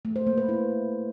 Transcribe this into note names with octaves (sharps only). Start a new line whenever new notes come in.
A3
C5
A#3
B4
E4